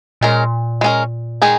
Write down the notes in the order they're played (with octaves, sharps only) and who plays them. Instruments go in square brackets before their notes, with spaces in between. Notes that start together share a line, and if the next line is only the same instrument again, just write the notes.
[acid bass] A#2 [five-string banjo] G#3 C#4 A#4
[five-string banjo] G#3 C#4 A#4
D#3 G#3 D#4 G#4